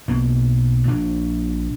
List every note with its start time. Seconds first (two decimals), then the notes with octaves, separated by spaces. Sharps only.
0.08 B1 B2 A#3
0.87 A#1 A#2 D4